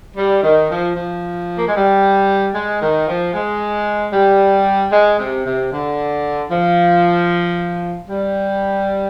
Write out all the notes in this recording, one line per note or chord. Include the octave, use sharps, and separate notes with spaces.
G3
D#3
F3
F3
A#3
G#3
G3
G#3
D#3
F3
G#3
G3
G#3
C3
C3
D3
F3
G3